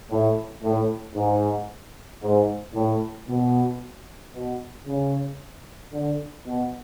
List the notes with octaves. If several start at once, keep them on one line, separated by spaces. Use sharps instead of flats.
A2
A2
G#2
G#2
A2
B2
B2
C#3
D3
B2